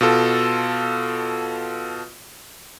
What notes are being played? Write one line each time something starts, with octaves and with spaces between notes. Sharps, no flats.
B2 F4 A4